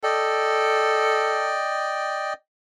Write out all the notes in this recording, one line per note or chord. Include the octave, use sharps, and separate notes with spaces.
A4 D5 D#5 G5